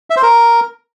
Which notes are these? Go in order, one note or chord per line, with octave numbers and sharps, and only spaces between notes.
E5
C5
A#4